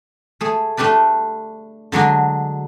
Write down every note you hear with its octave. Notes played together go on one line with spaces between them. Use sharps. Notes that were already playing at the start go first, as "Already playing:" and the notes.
A3 G#4
A3 D4 G4 B4 D5
D3 F#3 G#3 D4